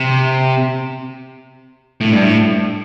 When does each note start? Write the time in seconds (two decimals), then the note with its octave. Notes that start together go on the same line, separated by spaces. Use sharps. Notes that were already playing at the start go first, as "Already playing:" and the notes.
Already playing: C3
2.01 A2
2.12 G2
2.23 A2